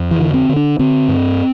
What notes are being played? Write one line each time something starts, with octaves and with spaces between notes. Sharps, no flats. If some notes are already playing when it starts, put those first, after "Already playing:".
Already playing: F2
E3
D3
C4
D3
D4
D3 C4
G2